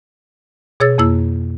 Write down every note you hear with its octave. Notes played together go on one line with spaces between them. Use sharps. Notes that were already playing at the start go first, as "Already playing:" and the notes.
B2 G#4 C#5 E6 A6
F2 A#3 E4 E6